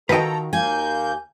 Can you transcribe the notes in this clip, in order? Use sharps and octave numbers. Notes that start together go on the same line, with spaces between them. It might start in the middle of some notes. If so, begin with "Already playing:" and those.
D#3 F4 F#4 A4 B4 D#5 G5 A#5
D#2 A#3 G#5 G6